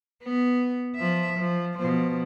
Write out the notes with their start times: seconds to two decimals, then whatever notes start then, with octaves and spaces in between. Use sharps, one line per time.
0.23 B3
0.96 F3 E5
1.39 F3
1.78 B2 F3